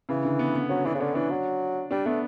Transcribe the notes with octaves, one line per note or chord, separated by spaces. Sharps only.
C#3 E3
D3
B3
B3
F#3 C#4
E3 D4
C#3
D3 C#4
E3 D4
F#3
G3 D4
A3 B3